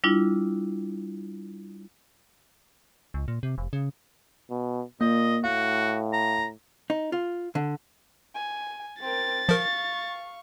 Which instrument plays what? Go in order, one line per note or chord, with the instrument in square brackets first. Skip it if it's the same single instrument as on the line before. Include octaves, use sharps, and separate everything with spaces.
[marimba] G3 D4 E4 F4
[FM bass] C#2
A#2
C3
F1
C#3
[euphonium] B2
[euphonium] A#2 [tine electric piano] A#3 [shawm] D#5
[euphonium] A2 [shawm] F#4 [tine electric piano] F5
[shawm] A#5
[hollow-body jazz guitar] D#4
F4
D3
[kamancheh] G#5
[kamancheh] C4 A#4 [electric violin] A6
[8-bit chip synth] F3 A#4 [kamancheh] F5 C#6